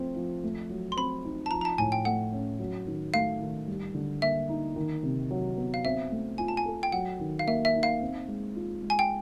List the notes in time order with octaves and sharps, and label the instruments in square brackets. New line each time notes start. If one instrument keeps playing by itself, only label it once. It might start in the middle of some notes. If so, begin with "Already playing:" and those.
Already playing: [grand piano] F3 A3 C4
F3
A3
F#3
[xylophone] C6
[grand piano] C4 [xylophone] B5
[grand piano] D#4
[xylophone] A5
[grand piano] F3 [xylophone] A#5
[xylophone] A#5
A5
[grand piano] A2 [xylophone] G#5
[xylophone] G5
[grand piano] A3 [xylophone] F#5
[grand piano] C#4
F#3
D#3
[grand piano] A3 [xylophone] F5
[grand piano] D#3
G3
D3
[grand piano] A#3 [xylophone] E5
[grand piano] D#4
D#3
C3
F#3
B3
[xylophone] F5
[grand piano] C4 [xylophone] E5
[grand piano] A3
[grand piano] F4 [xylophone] G#5
[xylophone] A5
G#5
[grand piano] A4
[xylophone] G5
[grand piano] F#3 [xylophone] F#5
[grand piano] D#3
[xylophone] F5
[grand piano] A#3 [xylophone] E5
[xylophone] E5
[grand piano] D#4
[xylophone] F5
[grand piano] C4
G#3
F4
G#3
[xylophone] G#5
G5